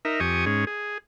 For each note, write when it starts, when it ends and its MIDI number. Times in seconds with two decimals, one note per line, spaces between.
0.05 0.20 63
0.05 0.20 70
0.05 0.20 76
0.20 0.45 41
0.20 0.45 67
0.20 0.45 80
0.20 0.45 85
0.20 0.45 87
0.46 0.65 44
0.46 0.65 61
0.46 0.65 68
0.67 0.98 68